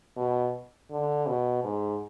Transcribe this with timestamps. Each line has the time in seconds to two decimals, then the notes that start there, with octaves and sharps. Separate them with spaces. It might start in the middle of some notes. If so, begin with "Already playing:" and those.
0.17 B2
0.91 D3
1.27 B2
1.64 G#2